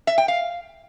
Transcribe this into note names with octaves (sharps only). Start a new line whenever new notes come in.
E5
G5
F5